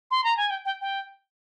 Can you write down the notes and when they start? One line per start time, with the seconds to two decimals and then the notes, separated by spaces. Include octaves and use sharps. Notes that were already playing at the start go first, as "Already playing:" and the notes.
0.11 C6
0.24 A#5
0.37 G#5
0.50 G5
0.65 G5
0.81 G5